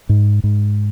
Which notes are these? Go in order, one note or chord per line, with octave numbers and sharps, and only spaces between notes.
G#2
G#2